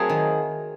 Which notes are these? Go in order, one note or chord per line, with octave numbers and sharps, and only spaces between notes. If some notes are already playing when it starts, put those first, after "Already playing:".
Already playing: F#3 A3 C4 G#4 A#4
D#3